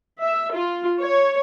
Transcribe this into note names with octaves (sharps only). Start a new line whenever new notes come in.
E5
F4
C#5